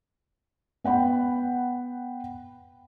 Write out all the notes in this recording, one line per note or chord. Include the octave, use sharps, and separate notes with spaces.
B3 F#5 G5 B5